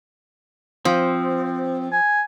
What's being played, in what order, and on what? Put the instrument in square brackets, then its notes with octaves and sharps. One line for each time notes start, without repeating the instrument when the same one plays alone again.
[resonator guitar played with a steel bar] F3 [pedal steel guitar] C4
[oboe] G#5